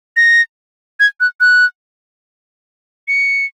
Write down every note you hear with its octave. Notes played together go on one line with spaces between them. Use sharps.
A#6
G#6
F#6
F#6
C#7